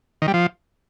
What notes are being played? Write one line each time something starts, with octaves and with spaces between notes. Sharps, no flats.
D#3
G3
F3